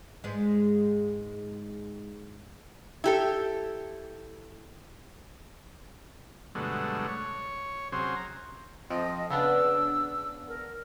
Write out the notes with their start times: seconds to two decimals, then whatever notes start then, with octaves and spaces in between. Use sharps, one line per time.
0.24 G#2 G#3
3.04 E4 G4 A4
6.55 G2 B2 D3 F#3 G#3 A3
7.07 C#5
7.92 C3 F#3 C#4 G#4 C5
8.16 A#5
8.90 F2 F3 C4 D#5
9.30 C#3 B3 D4 E6
10.48 A#4